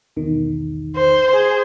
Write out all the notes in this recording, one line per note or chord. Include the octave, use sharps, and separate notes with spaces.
B1 E2 D#3
C5
G#4 C5